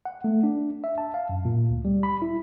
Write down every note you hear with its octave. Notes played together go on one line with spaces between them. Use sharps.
F#5
A3
D4
E5
A5
F5
F#2
A#2
D2
G3
B5
E4